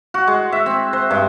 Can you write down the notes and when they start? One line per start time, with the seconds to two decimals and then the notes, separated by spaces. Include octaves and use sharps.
0.14 F#4
0.27 G#3
0.52 E5
0.66 C4
0.93 C5
1.11 G2